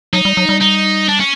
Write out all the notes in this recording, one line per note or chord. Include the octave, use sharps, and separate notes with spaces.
F#3 D#4
G3
F#3
G3
D#4
D4
C#4